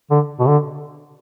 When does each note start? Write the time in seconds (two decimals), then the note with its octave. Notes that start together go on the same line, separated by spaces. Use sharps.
0.11 D3
0.39 B2
0.48 D3